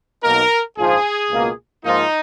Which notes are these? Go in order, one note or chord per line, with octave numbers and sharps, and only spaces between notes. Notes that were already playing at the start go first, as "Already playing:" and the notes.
B1 B2 A#3 D#4 A#4
A#1 G#2 F3 G#4
C#2 B2 A#3 F4
G#2 F3 A#3 D#4 F4